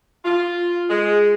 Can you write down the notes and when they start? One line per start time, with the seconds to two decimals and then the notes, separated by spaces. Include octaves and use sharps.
0.25 F4
0.89 G#3